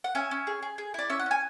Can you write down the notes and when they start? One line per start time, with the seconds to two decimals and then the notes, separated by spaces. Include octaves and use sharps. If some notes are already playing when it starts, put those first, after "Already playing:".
0.04 F#5
0.15 C#4 E5 G#5
0.31 C#4
0.47 G#4
0.63 G#4
0.78 G#4
0.94 E4 D5
1.10 C#4 E5
1.20 F#5
1.26 C#4 G#5